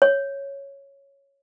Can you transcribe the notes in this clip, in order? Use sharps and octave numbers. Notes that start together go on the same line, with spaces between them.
C#5